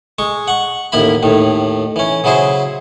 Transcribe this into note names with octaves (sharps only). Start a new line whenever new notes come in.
G#3 C#6
F#5 C#6
A1 D#2 A#3 E4 B5
D#2 A2 D#3
E3 C#4
C#3 F#3 E4 G#4 C5